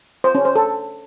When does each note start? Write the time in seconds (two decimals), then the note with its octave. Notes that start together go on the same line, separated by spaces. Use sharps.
0.24 C5
0.35 C#4
0.45 C5
0.55 A4